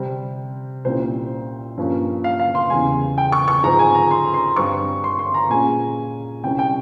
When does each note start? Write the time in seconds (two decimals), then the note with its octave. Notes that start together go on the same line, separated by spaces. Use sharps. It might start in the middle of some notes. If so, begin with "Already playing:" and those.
Already playing: C3 G3 C4
0.85 C2 A#2 G3 C#4 C5
1.77 G2 F3 A#3 C#4
2.24 F5
2.39 F5
2.55 C6
2.70 E2 C#3 G3 G#5
3.18 G5
3.32 C#6
3.48 C#6
3.63 G#2 F3 C4 A#5
3.79 G#5
3.95 A#5
4.11 C6
4.34 C6
4.56 G2 G3 C4 C#6
5.04 C6
5.19 C6
5.34 A#5
5.50 A#2 G#3 C#4 G#5
6.43 C2 C3 G3 C#4 G5
6.59 G5